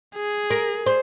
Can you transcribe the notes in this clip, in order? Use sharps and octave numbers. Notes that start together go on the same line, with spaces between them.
G#4
A#4
C5